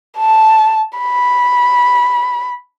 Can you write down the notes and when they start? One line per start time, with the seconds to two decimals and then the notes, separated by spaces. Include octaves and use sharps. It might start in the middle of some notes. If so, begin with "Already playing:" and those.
0.17 A5
0.98 B5